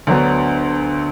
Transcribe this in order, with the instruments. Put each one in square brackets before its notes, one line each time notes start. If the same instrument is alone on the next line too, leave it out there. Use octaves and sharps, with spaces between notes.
[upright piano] D2 D3 F#3 B3